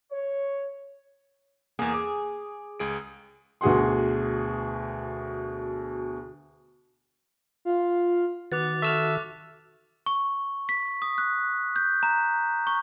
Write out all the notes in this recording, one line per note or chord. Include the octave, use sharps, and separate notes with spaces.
C#5
E2 A#3 G#4
D6
C#2 G#4 D7
D2 B2 G#4 F#5 C6
F4
D#3 B3 F#4 D6 F#6 A6
A4 E5 C#6 E6 F6
C#6
B6
D#6
F#6
G6
A#5
C#6